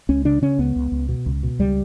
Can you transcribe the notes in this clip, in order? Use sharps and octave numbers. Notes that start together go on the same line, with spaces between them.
C#2 C#4
C#3 D4
C#3 C#4
C#2 B3
C#2
C#2
B2
C#2
B2
C#2 G3